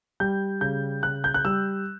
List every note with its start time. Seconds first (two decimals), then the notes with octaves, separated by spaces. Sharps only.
0.20 G3 G6
0.61 C#3 G6
1.03 C#3 F#6
1.24 G6
1.34 F#6
1.45 G3 E6